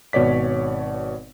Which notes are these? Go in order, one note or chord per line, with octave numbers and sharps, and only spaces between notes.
G#1 B2 C#5 D5 B6